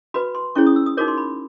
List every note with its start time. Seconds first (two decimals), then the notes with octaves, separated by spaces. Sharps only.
0.14 F#4 B4 B5
0.35 C6
0.55 C#4 E4 G#4 C#5 C#6
0.66 D#6
0.76 E6
0.86 D#6
0.97 D#4 F#4 A#4 C#5 D6
1.08 C6
1.17 B5